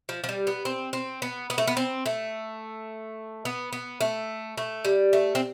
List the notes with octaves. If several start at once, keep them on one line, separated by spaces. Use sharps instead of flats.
F3
F3
G3
B3
C4
C4
B3
B3
A3
B3
C4
A3
B3
B3
A3
A3
G3
A3
C4